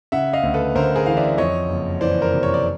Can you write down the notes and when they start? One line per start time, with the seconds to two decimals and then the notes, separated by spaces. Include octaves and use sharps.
0.12 C#3 E5 F#5
0.33 D#5 F5
0.43 D2
0.54 A4 B4
0.75 D2 A#4 C5
0.96 G#4 A#4
1.06 E3 F5
1.17 D5 E5
1.38 F2 C#5 D#5
1.70 F#1
2.01 E3 C5 D5
2.22 A#4 C5
2.33 C3
2.43 C#5
2.54 D5